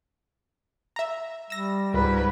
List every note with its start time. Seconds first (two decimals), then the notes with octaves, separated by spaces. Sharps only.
0.96 E5 A#5
1.50 G3 E6 A#6
1.94 C#2 G#2 B4